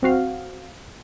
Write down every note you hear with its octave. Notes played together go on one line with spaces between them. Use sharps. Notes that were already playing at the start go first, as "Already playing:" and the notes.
B1 C4 F#4 F5